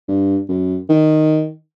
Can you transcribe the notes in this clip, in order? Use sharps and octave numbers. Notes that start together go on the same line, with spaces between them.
G2
F#2
D#3